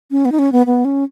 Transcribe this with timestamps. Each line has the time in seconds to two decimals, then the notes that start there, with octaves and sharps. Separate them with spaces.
0.11 C#4
0.25 B3
0.32 D#4
0.39 C#4
0.52 B3
0.66 B3
0.85 C#4